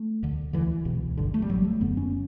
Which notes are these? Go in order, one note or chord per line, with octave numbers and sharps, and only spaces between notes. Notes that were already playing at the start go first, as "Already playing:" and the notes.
Already playing: A3
D2 D3
D2 D3 E3
C#2 B2
G1 G2 D3
A3
G3
A1 A2 F#3
A3
F#1 F#2 D3 B3
C#4